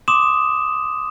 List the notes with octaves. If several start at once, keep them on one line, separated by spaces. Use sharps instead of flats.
C6 D6 D#6 E7